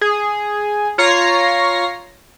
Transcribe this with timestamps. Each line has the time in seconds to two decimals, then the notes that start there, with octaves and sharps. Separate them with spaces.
0.01 G#4
0.98 F4 C#5 A#5 A#6 C7